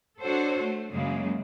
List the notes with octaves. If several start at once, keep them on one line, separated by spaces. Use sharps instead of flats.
D4 F#4 A4 C5 C#5
A3
F#2 C#3 G#3 A#3